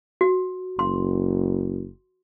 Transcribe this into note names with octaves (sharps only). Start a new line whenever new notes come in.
F#4
F#1 C6